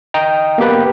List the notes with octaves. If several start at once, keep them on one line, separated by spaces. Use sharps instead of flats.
D#5 G5 A#5
A#3 B3 G4 B4